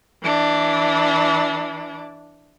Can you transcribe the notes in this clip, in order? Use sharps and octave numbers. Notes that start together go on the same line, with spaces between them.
E3 D4